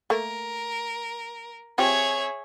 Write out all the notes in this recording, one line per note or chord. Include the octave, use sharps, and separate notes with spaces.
A3 A#3 A#4
C4 F4 G4 G#4 C#5 E5